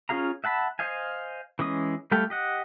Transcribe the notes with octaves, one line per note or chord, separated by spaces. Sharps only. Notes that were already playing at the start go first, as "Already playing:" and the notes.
C#4 F4 G#4 F5 A#5
E5 F#5 A5 B5
C5 D#5 F5 G#5
E3 G#3 C#4 D#6
G3 A3 A4 F5 G5
G4 D#5 F#5